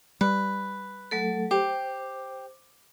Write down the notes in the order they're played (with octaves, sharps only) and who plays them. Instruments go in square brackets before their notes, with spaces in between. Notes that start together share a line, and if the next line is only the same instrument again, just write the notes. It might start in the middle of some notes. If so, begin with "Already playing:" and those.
[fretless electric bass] G3 [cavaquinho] B4
[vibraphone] F#3 A3 A4
[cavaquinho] G4 [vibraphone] C5